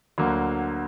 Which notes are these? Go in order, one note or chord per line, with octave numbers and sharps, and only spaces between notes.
D2 D3 F#3 A#3